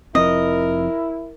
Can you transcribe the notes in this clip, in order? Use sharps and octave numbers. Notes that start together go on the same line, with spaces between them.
F1 F3 C4 E4 A#4 D#5